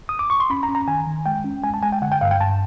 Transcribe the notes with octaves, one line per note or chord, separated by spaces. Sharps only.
D#6
D6
C#6
C6
C#4 B5
A#5
C#4
A#5
D#3 G#5
D#3
G#3 G5
C#4
G#3 G#5
A5
G#3 G#5
G5
D3 F#5
G5
G2 F5
G5
G2 A5